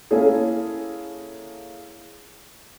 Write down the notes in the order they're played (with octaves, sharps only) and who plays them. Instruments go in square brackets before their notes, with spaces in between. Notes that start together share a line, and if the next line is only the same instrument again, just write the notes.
[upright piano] A#3 C#4 E4 G#4 A4